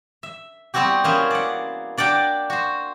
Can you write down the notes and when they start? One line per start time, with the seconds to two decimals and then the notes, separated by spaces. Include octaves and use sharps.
0.23 E5
0.74 G3 B3 C4 E4 F#4 G4
1.04 E3 A#3 C#4 G#4 B4 C5
1.31 D5 F#5
1.97 D4 D5 F#5 G5 A#5
2.50 F#4 C5